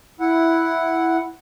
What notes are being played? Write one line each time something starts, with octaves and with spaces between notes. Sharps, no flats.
E4 F#5